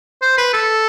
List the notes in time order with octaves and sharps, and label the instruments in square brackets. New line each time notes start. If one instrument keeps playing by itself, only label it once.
[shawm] C5
B4
A4